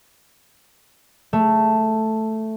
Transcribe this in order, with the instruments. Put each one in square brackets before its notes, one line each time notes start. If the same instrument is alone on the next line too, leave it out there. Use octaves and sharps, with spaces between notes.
[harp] A3